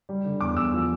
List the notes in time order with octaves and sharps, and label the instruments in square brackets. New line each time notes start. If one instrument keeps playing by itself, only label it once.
[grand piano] G3
D3
E2 D6
E2 E6
F3